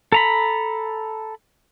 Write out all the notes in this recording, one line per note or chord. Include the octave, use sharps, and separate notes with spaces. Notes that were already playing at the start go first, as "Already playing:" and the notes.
A4 A#5 B5